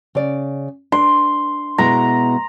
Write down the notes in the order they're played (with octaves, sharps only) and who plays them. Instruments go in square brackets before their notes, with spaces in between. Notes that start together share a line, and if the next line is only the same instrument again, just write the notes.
[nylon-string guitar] C#3 D5
[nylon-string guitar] D4 [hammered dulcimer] C6
[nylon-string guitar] B2 G#3 E4 [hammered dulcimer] A#5